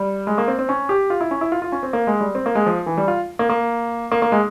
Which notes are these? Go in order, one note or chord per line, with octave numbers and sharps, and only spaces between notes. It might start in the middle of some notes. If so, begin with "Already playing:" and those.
Already playing: G3
G#3
A#3
C4
C4
C#4
G4
F4
E4
C#4
E4
F4
F4
C#4
C4
A#3
G#3
G3
C4
A#3
G#3
F3
E3
G3
F4
A#3
A#3
A#3
A#3
G#3